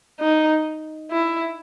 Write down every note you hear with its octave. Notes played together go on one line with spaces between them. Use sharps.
D#4
E4